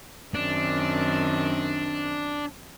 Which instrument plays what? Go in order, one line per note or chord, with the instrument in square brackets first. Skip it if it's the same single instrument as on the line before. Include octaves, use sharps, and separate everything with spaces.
[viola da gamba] F#2 D#3 C4 [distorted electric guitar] D4